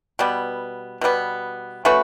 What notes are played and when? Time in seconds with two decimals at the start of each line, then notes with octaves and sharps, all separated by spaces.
0.19 B2 G3 B3
1.01 B2 G3 B3
1.85 A3 C#4 F#4 B4